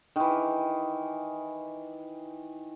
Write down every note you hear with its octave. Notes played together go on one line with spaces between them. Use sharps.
D#3 E3